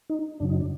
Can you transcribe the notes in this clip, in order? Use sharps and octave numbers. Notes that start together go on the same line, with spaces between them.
D#4
F#2 C#3 F#3 D4
D#4
D4